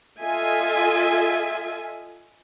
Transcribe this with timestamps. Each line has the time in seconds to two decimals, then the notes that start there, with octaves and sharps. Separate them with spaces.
0.21 F4 A4 D#5 E5 G#5